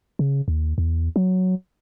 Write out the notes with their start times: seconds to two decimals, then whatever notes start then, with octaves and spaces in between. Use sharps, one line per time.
0.19 C#3
0.48 D#2
0.78 E2
1.16 F#3